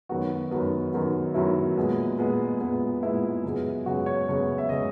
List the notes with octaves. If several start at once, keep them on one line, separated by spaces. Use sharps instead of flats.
F#2 D#3 F#3 B3 F#4
F#2 D#3 F#3 B3
F#2 D#3 F#3 B3
F#2 D#3 F#3 B3 E4
A#2 G#3 B3
A#2 G#3 B3
A#2 G#3 B3
A#2 G#3 B3 E4
F#2 C#3 G#3 B3
F#2 C#3 G#3 B3 F#4
C#5
F#2 C#3 G#3 B3 C#5
E5
C#3 G#3 B3 D#5